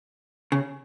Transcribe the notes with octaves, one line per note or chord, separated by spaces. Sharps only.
C#3